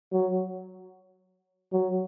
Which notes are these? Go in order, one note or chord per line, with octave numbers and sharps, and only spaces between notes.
F#3
F#3